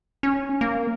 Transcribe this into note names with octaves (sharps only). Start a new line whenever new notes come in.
C#4
A#3